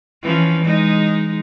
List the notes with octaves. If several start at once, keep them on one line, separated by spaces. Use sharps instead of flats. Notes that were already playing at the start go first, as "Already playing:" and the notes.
E3 F3 C#4
G#3 D#4